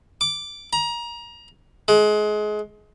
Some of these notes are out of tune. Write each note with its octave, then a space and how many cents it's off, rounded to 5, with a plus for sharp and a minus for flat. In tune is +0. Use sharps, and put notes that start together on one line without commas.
D6 -5
A#5 +25
G#3 +25